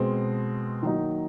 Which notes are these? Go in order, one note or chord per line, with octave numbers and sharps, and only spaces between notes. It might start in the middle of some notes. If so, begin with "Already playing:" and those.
Already playing: B2 G#3 C4
D#3 F#3 A#3 D#4